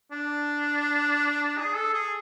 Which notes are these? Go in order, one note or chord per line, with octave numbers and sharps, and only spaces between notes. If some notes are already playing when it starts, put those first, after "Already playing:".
D4
G#4
A4
G#4